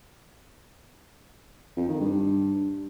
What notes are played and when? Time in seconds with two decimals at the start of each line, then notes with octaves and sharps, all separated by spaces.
1.77 F2
1.89 D#3
2.00 G2